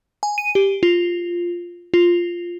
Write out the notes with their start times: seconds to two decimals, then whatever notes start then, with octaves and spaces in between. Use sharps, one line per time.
0.23 G#5
0.38 D#7
0.55 G4
0.83 F4
1.94 F4